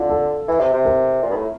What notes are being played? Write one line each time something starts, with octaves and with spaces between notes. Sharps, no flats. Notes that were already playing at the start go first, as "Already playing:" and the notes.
Already playing: D3 F4
A4
E3
C3
C3
A#4
A#2
G2
A2